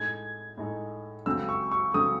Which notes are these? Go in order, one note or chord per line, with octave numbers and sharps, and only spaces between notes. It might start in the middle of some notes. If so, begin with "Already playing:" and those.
Already playing: A2 G#3 D#4 A4 G#6
A2 G#3 D#4 A4
C#2 C#3 F#3 A3 C4 E6
C#6
C#6
C#2 C#3 F#3 A3 C4 D#6